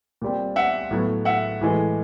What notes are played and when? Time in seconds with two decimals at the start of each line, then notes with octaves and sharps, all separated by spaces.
0.22 A#2 G3 C4
0.56 E5 F#5
0.91 A2 F#3 B3
1.25 E5 F#5
1.61 A2 E3 G#3